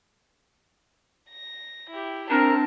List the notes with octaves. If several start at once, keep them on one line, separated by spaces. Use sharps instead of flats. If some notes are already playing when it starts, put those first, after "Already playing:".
A#6
E4 G4
C4 D4 A#4 A5